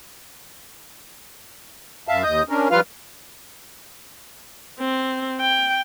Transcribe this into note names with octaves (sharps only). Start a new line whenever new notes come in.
F#2 E5 F5 A5
D#2 D#5 D#6 G6
C#4 D4 A#4
F3 G3 F4 B4 F5 F6
C4
G5